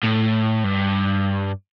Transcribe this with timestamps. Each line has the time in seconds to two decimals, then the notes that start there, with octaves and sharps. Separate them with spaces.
0.03 A2
0.64 G2